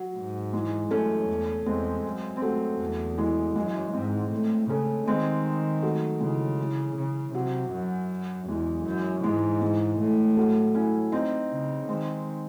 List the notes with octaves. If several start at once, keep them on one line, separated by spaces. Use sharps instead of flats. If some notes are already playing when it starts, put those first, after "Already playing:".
Already playing: F#3
G#2
E3 G#3
F#2 A3 C#4
E2
E2 G#3 C4
F#2
C4
F#2 F#3 A3
E2
E3 G#3
F#2 E3 G#3
G#2 G#3 C4
A2
C#3 A3 C#4
D#3 G#3 C4
F#3 A3
C#3 E3 G#3
E3
C#3
C3 F#3
F#2
E2 E3 G#3
F#2
G#2 E3 G#3
E3 G#3
A2
F#3 A3
C#4 E4
C4 D#4
C#3
D#3 G#3 C4